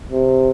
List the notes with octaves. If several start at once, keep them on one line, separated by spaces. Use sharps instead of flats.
C3